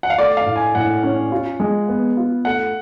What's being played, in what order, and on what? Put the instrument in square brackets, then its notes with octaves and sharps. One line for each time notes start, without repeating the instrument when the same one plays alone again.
[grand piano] F#5
F5
[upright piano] A3 [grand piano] D5
[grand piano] F5
[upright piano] A2
[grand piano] G#5
[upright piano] A2 [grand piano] F#5
[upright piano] C#4
F4
G#3
B3
F4
[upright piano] A3 [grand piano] F#5